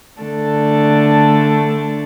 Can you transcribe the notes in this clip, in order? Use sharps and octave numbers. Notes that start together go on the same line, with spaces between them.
D3 A3 D4 A4